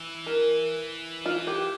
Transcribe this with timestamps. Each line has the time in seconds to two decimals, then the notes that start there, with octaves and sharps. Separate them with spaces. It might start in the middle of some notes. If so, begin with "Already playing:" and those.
Already playing: E3
0.27 A#4
1.26 F4
1.47 G4